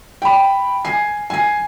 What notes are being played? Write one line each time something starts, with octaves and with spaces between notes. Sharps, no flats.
G5 B5
G#5 C7
G#5 C7